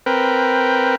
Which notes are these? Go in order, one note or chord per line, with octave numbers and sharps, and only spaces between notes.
C4 A#4 B4 G5